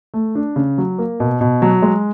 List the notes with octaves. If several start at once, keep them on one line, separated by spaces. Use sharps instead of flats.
A3
D4
C#3
F#3
A#3
B2
B2
F#3
G#3